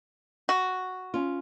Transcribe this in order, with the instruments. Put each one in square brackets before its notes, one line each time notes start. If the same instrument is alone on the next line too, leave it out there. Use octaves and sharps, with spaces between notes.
[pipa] F#4
[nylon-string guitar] C#4 F4